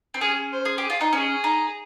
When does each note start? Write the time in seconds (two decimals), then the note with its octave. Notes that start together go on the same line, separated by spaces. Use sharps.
0.14 C4
0.21 C#4 G#4
0.52 C5
0.65 G#4
0.78 G4 G#4
0.90 F4
1.01 D#4
1.13 C#4 G#4
1.44 D#4